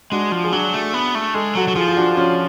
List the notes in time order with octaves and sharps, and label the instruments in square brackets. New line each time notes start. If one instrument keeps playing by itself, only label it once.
[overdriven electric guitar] G#3 [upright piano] D4 F#4
[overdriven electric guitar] F3
[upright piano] G#4
[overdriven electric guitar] F#3 [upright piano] D4 F#4
[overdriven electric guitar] A3
B3
A3
[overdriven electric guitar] G#3 [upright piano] A4
[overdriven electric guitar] F#3 [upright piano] F#4 A4
[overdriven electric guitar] F#3
[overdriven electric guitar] F3 [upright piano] F4 G#4
[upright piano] F4
D4 F#4
C#4 F4